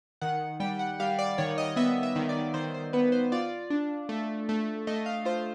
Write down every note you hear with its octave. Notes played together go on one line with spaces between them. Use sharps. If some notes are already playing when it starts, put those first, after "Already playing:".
D#3 F#5
G3 G5
F#5
G3 F5
D5
D#3 C#5
D#5
B3 E5
E5
D#3
D5
D#3 C5
C5
B3 B4
C5
F4 D5
D4
A3
A3
A3 D#5
F5
F4 C5